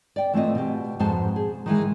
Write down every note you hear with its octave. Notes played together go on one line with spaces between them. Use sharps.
D5 G5
E3 A3 C4 F4 D#5
B2 G4
F2 G#2 B3 F#4 C5 A5
G#4
D#3 E3 G#3